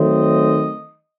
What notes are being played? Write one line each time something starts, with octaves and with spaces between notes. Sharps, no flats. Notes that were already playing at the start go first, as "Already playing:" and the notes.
Already playing: D#3 F#3 A3 C4 D#5